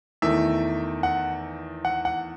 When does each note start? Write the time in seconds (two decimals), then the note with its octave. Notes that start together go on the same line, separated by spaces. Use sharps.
0.22 E2 D#3 A3 E5
1.03 F#5
1.85 F#5
2.05 F#5